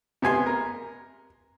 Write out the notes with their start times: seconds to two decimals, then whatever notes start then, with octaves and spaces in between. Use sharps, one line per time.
0.22 C3 B3 G#5 C6
0.47 A#4